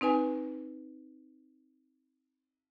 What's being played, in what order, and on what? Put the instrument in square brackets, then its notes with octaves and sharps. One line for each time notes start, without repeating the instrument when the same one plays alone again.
[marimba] C4 D#4 B4 G#5